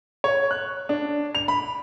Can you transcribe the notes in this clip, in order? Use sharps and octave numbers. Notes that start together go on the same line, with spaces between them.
C#5
F#6
D4
F7
B5